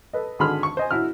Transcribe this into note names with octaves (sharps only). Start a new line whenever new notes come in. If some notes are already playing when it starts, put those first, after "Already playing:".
A4 B4 D#5
G#1 D3 G#4 B5 C6 F6
C#6
C5 D#5 G#5
A2 E4 F#4 F6